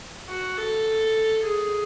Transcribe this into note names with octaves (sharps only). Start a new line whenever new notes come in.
F#4
A4
G#4